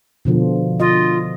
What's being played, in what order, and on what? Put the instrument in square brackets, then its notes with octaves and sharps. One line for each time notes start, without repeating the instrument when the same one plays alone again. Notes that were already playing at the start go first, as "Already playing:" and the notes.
[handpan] B2 D3 F3
[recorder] F4 [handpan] D#5